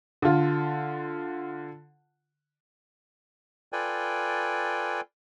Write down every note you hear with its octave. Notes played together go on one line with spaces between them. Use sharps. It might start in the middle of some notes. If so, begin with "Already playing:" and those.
D3 F4
F4 A4 B4 D5 G5 G#5